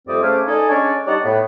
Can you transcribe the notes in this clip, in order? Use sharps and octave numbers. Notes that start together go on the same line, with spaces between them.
F2 G3 A3 C4 D5 D#6
C#3 A3 C5 F5 G#5 D6
D#4 A4 D5 D#5 G#5
G#3 C#4 D4 C#5 D5
G3 D#4 C#5 D5 F#5 A5
A2 B3